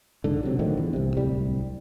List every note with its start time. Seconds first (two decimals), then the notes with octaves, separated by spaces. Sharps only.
0.24 B1 G#2 D3
0.43 C3 F#3
0.59 A2 D3 D#3 F3
0.77 E2
0.93 C2 C3
1.16 D1 C2 G3